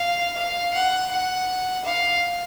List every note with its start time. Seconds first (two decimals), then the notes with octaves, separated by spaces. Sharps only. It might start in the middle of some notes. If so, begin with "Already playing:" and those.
Already playing: F5
0.37 F5
0.74 F#5
1.11 F#5
1.85 F5